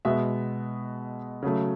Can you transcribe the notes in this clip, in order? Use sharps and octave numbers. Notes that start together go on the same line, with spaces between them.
B2 G#3 B3 E5
C#3 F#3 A3